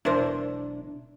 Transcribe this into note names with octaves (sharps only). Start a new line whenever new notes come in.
E1 B1 D4 E4 A#4 C5